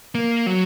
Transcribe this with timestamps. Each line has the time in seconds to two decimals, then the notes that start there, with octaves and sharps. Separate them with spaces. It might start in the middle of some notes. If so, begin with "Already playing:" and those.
0.15 A#3
0.46 F#3